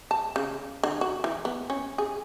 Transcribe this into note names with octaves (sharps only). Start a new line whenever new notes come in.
A5
C#3
D3
F#4
E3
B3
C#4
G#4